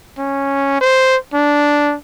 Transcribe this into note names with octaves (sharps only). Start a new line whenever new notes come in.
C#4
C5
D4